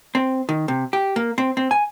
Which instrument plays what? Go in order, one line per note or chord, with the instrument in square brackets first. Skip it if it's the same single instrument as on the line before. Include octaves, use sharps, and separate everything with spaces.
[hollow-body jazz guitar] C4
D#3
C3
G4
A#3
C4
C4
G#5